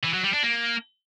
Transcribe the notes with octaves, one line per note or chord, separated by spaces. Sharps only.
E3
F#3
G3
D4
A#3